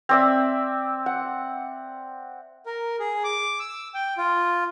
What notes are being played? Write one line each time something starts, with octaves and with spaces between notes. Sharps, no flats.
C4 D5 E5
F#5
A#4
G#4
D6
E6
G5
F4